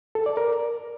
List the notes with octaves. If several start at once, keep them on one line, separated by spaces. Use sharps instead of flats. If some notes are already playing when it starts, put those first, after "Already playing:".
A4
D5
A#4